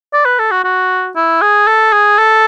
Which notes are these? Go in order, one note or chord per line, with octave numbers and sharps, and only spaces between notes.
D5
B4
A4
F#4
F#4
E4
G#4
A4
G#4
A4